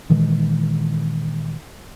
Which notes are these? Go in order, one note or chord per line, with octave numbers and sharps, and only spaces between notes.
A#2 D#3 E3 G#3